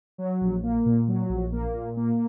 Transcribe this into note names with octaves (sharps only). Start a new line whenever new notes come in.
F#3
A#1
A#3
A#2
F#3
A#1
A#3
A#2
A#3